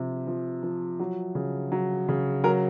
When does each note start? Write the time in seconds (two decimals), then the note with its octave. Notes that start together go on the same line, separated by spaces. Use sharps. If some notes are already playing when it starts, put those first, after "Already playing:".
Already playing: C3 F3
0.27 F3
0.63 F3
0.99 F#3
1.35 C#3
1.72 F#3
2.09 C#3
2.44 F#3 A#4